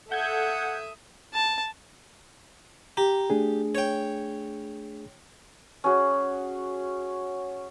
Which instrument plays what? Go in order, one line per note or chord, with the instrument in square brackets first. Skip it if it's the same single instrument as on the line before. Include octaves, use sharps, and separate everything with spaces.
[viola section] A4 [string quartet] E5 D#6 [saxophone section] F#5 [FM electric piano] G6 G#6
[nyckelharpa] A5
[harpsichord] G4 [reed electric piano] A#5
[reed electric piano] A3 D4 G#4
[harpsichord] C#5 G5
[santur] C#4 F#4 G#4